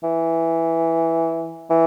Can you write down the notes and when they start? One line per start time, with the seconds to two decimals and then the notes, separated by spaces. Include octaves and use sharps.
0.03 E3
1.70 E3